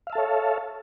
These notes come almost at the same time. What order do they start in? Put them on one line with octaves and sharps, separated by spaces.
F5 E5 A5 A4 C#5